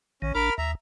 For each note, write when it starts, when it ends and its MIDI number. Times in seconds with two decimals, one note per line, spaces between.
0.22 0.32 34
0.22 0.32 51
0.22 0.32 61
0.35 0.50 33
0.35 0.50 62
0.35 0.54 70
0.35 0.54 83
0.35 0.54 89
0.58 0.75 39
0.58 0.71 76
0.58 0.71 82